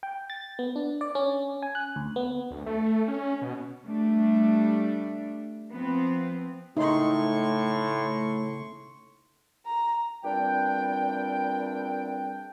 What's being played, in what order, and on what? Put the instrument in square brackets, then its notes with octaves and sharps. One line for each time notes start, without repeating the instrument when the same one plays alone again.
[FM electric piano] G5
A6
B3
D4
D5
C#4
G#5
F#6
D2
B3
[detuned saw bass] D2
A3
C#4
B2
[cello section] G3 A3 D4
F3 B3 C4
[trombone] A2 [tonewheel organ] C#3 A3 [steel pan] D#4 [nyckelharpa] C6 C#6
[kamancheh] A#5
[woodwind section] E2 A#2 G3 C4 D4 G5